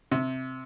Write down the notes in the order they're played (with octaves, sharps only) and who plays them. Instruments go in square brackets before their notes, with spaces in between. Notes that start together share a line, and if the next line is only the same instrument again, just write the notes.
[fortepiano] C3